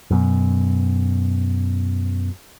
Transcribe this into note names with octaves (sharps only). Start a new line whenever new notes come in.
F#2 B2